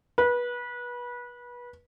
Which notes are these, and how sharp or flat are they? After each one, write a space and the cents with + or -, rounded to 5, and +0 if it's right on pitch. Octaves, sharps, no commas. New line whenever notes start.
B4 -25